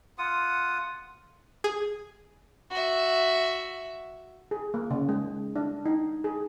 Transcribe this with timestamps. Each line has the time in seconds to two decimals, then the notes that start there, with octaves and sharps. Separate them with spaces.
0.18 F4 F#5 D#6
1.64 G#4
2.71 F#4 E5
4.51 G#4
4.74 A#3
4.91 C#3
5.09 G#3
5.56 D4
5.86 D#4
6.24 G#4